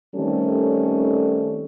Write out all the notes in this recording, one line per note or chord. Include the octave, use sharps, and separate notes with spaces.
D#3 G3 A3 C4 C#4 A4